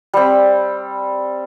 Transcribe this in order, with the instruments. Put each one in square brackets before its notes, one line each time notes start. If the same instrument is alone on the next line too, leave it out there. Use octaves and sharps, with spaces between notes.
[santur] G3 C4